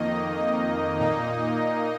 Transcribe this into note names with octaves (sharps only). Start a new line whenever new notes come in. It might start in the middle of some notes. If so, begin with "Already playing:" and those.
Already playing: F2 D#3 A#3 D#4 D#5
A#2 A#3 D#4